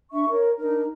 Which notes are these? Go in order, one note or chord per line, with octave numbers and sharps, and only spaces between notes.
D4 E5 C#6
A#4 C#5
D4 D#4 A#4